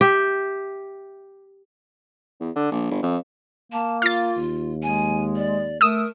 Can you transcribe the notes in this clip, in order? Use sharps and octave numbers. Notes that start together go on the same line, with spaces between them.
G4 E5
E2
D3
A#1
G1
F2
A#3 A5
F4 F5 A6
D#2
G#3 G#5
D5
A3 A#4 D#6 E6